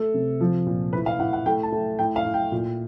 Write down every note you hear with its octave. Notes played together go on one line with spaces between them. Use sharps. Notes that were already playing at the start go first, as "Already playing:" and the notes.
Already playing: A3 A4
C3
F3
A#2
A2 B4
F5
A2 F#5
F#5
A3 G5
A5
A3
A2 G5
F5
A2
G5
A#2